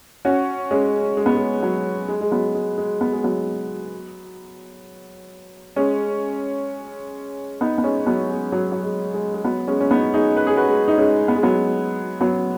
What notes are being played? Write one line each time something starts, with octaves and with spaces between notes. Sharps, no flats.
C#4 F#4
G#3 C#4
G#3
B3
G#3
F#3
G#3
G#3
F#3 B3
G#3
G#3
B3
G#3
F#3 B3
G#3 C#4
B3 D#4
B3
G#3 C#4
F#3 B3
G#3
F#3
F#3
G#3
G#3
G#3
F#3 B3
G#3 C#4
C#4
B3 D#4
D#4 G#4
B4
G#4
F#4 B4
G#3
D#4
G#3 C#4
B3
G#3
F#3 B3
F#3 B3